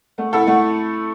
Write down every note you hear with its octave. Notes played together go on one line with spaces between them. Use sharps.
A3 F#5
E4 A4 F#5
A3 F#5